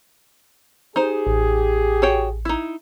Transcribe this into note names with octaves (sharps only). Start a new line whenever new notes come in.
D#4 G4 G#4 C5
A1
F#4 C#5 G5
D#4 E4